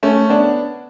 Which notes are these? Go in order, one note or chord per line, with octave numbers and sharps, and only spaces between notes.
A3 C#4
B3 D4